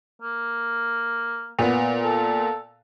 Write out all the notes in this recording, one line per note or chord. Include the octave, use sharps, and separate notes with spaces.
A#3
A#2 B3
A4